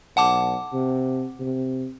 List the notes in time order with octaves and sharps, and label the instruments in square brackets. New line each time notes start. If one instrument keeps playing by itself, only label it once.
[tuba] B1 [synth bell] F#5 A5 D6
[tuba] C3
C3